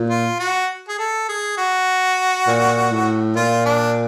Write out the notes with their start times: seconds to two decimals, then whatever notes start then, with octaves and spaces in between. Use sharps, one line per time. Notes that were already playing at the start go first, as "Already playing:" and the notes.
Already playing: A#2
0.10 F4
0.39 F#4
0.88 G#4
0.99 A4
1.29 G#4
1.58 F#4
2.47 A#2
2.91 A2
3.36 A#2 F4
3.66 D4